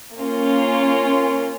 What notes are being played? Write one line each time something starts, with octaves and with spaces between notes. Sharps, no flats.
A#3 C#4 F4